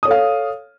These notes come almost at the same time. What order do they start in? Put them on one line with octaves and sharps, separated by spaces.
D#6 C#5 A4 F5